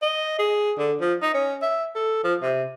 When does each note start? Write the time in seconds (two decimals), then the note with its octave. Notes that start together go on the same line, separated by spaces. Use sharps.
0.02 D#5
0.39 G#4
0.79 D3
1.01 F3
1.22 D#4
1.34 C#4
1.62 E5
1.95 A4
2.24 F3
2.42 C3